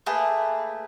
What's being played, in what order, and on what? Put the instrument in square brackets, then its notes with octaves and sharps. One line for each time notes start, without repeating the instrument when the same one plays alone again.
[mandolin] A3 A#3 G#4 B4